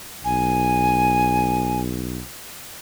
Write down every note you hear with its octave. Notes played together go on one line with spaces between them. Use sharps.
B1 G#5